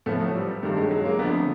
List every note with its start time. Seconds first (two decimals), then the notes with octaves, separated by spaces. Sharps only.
0.06 A2 F3 A3 B3
0.20 F#3
0.34 G3
0.63 G2 D#3 G3 A3
0.77 F#3 G#3
0.91 F#3 G#3
1.05 G#3 A#3
1.19 F2 D3 F3 A3 B3